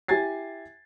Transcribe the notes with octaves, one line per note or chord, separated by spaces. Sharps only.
E4 G4 G#5 G#6 A6 C7